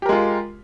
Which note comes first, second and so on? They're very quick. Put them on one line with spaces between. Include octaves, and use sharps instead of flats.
G4 A#4 G#3 F4